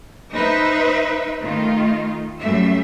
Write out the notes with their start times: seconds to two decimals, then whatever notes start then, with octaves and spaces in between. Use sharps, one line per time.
0.34 D#4 B4 C5 E5
1.42 D#3 A3 F4
2.41 F#2 G3 A3 E5